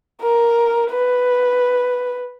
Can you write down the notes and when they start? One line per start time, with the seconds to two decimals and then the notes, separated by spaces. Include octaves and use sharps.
0.22 A#4
0.91 B4